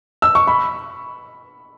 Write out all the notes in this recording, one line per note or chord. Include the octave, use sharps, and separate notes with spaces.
E6
C#6
B5